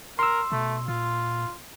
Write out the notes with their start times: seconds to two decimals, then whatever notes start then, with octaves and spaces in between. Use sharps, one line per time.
0.19 A#4 C6 E6
0.52 B2 A3
0.88 A#2 F4